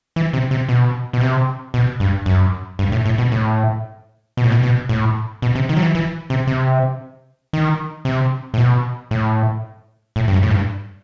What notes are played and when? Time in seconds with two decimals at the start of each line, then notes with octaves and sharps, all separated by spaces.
0.16 E3
0.33 C3
0.51 C3
0.69 B2
1.13 B2
1.21 C3
1.74 B2
2.00 G2
2.26 F#2
2.79 G2
2.92 A2
3.06 A2
3.18 B2
3.32 A2
4.37 B2
4.44 A2
4.52 B2
4.63 B2
4.89 A2
5.42 B2
5.55 C3
5.69 D#3
5.76 F#3
5.82 E3
5.95 E3
6.30 C3
6.47 C3
7.53 D#3
8.05 C3
8.54 A2
8.58 B2
9.11 A2
10.16 A2
10.28 G2
10.33 F#2
10.43 A2
10.51 G2